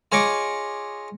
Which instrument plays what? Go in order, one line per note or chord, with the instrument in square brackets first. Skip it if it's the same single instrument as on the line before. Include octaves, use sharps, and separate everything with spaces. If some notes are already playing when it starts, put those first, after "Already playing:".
[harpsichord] F4 G#4 C#5 D#5 C#6 D6